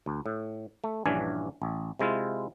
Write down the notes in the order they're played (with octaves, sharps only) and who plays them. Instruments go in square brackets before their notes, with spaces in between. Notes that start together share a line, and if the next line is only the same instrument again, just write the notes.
[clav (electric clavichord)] D2
A2
A3
A#1 G2 E3 C#4 D4 G#5
A1
C3 G#3 E4 F4